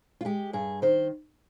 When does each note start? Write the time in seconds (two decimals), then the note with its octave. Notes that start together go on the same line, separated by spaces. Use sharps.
0.21 F4
0.25 G#3 G4
0.53 G2 G#4
0.82 D#3 C5